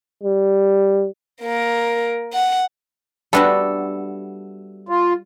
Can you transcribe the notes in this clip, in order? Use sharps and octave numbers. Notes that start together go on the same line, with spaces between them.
G3
A#3 A#4
F#5
G3 A3 B3 D4 F#4 A4
F4